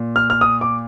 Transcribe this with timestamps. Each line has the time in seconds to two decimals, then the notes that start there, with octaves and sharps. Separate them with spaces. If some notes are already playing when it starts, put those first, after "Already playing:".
Already playing: A#2
0.16 F6
0.30 F6
0.41 D#6
0.61 D6